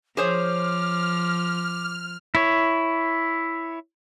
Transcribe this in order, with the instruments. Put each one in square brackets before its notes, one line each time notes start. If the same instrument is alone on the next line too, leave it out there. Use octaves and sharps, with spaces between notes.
[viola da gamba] F3 [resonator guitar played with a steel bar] G#4 C5 C#5 [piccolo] D6 [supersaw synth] F6
[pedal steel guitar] E4 C#5